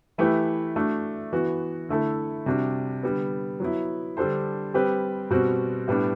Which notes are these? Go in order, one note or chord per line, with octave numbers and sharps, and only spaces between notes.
E3 A3 E4 G4 B4
A3 D4 F#4
E3 B3 F#4
D3 A3 E4 A4
C3 G3 D4 F#4
D3 G3 B3
F#3 B3 E4
D3 G3 D4 A4 C5
G3 C4 G4 B4
B2 G3 C4 F#4
A2 G3 B3 D4